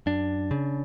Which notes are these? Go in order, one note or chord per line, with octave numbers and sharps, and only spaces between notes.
F#2 D4
C#3